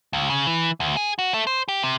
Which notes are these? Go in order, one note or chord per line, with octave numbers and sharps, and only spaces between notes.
C#2
C#3
E3
D2
G#4
F#4
A3
C5
G4
C3